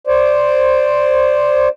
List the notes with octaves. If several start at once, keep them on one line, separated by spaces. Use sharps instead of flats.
C5 D5